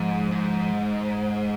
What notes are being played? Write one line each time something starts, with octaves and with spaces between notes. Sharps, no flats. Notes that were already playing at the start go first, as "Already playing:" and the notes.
Already playing: G#2 F3
G#2